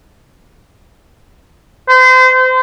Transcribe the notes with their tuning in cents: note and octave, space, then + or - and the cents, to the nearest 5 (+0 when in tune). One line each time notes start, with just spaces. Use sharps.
C5 -30